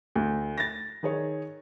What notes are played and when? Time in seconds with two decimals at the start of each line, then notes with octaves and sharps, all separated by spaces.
0.16 D2
0.58 A6 A#6
1.03 D#3 G#4 C#5